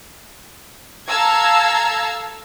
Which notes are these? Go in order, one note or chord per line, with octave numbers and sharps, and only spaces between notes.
A4 F5 A5 A#5 E6 G#6